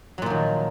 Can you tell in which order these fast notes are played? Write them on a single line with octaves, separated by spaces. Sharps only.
F#3 A#2 F3 D#3